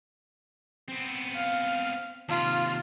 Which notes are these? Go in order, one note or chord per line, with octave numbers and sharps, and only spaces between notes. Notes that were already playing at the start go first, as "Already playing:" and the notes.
B3 C4
F5
D#2 C3 F4